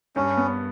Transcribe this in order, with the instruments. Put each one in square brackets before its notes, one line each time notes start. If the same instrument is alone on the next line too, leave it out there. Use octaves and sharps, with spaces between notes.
[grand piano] G2 [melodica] C#4
[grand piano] B3